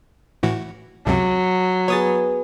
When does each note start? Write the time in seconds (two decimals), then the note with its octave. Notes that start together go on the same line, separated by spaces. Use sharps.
0.43 A2 E3 F#4
1.06 C#2 F#2 C3 F#3
1.88 B3 G#4 C#5 D#6 A6